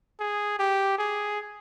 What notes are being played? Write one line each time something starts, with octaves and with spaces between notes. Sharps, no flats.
G#4
G4
G#4